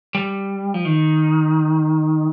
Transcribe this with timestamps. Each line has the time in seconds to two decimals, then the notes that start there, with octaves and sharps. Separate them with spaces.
0.15 G3
0.74 F3
0.85 D#3